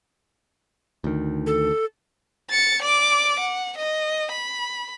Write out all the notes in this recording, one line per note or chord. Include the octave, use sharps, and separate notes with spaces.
D2 D#3
A4
A6 C#7
D5 D6
F#5
D#5
B5